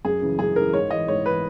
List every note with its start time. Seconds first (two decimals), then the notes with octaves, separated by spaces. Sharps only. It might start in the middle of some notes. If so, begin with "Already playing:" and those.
0.05 F#2 G#4
0.22 C#3 E3
0.39 F#2 G#4
0.56 C#3 E3 A#4
0.73 G#2 C#5
0.91 E3 D#5
1.08 G#2 C#5
1.26 E3 B4